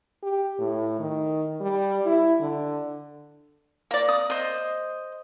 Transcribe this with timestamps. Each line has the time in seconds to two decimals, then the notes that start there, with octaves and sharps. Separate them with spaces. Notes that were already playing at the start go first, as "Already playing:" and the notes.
0.23 G4
0.59 A2
1.00 D#3
1.61 G3
2.06 E4
2.41 D3
3.91 A#3 D5
4.09 D#6
4.30 C5 D#5